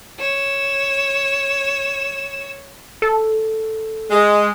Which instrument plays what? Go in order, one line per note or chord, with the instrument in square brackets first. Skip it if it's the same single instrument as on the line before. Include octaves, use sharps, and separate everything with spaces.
[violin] C#5 E7
[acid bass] A4
[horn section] G#3